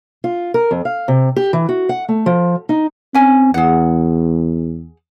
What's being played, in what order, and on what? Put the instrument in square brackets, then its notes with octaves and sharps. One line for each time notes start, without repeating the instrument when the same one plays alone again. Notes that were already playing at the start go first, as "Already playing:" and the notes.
[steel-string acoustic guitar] F4
A#4
F2
F5
C3
G4
E3
F#4
F#5
A3
F3
D#4
[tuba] C4 [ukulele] C#4 G#5
[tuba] E2 [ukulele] G#4 F#5